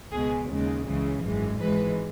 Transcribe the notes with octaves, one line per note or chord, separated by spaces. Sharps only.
C#2 B2 G#3 G#4
D#2 C#3 G#3
C#2 C#3 E3 G#3
G#1 F#2 E3 G#3
G#1 G#2 E3 G#3 B4